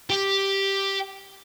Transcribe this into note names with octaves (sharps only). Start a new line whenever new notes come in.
G4